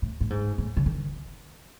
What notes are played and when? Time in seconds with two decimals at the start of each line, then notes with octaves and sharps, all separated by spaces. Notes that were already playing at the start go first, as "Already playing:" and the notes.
0.02 A2
0.21 A2
0.30 G#2
0.58 A2
0.77 C#3
0.86 D#3